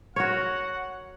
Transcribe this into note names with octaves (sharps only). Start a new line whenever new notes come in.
F#4 A#4 C#5 F#5